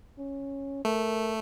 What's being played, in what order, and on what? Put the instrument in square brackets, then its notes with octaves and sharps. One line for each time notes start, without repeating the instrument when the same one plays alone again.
[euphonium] C#4
[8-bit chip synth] A3 [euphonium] A#4